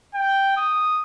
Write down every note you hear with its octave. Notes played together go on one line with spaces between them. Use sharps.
G5
D#6